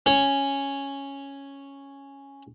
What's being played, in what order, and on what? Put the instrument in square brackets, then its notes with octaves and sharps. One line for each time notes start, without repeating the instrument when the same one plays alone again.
[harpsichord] C#4 C#5